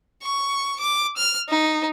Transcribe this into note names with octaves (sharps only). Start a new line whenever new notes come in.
C#6
D6
F6
D#4